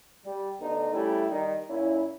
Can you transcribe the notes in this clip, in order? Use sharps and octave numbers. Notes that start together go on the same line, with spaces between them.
G3
D2 D3 B3 D#4
G3 A3 C#4 E4 G4
D#3 G3 D#4
A#2 C#4 E4